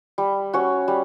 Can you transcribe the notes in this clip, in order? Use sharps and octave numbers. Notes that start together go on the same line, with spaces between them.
G3
C#4 F#4 C#5
G3